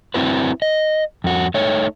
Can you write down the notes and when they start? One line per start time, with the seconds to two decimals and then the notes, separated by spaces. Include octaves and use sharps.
0.14 C4 E4 F#4 B4
0.62 D#5
1.24 F2 F#4
1.54 A3 D#4 C#5